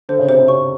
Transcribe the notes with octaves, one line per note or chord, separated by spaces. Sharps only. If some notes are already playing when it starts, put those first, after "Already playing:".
D3 C5
C#3
C3 C5
C3
C#3 C#6